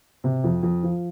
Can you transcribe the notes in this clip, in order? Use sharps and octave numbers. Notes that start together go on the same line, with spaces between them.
C3
F2
F2
F3